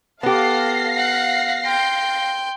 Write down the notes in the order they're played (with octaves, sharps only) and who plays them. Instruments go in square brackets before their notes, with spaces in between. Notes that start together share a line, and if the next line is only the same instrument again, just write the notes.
[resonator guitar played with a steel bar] B3 G4 [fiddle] A4 [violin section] F5 A#6 C7
[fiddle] F#5
G5 C6